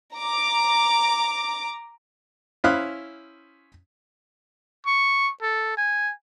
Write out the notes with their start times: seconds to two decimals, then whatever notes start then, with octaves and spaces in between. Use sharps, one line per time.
0.14 A#5 D6
2.64 C#4 E4 C5 F5 D#6 F#6
4.86 C#6
5.42 A4
5.77 G#5